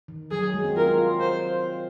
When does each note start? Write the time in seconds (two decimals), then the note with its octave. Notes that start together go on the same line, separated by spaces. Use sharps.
0.08 D#3
0.31 F#3 G#4
0.42 F#3
0.54 G#3
0.64 C4
0.76 F4 A#4
0.98 F4
1.20 C5